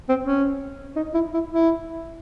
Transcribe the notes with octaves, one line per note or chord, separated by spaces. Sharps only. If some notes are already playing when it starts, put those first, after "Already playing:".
C4
C#4
D#4
E4
E4
E4